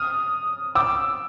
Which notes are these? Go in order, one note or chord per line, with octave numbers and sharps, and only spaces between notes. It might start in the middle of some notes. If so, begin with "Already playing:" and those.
Already playing: D#6 F6
D6 E6